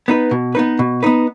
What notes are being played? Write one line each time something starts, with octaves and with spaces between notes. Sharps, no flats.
B3 D#4 B4
B2
B3 D#4 B4
B2
B3 D#4 B4